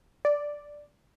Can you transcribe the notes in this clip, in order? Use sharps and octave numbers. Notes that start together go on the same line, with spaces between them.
D5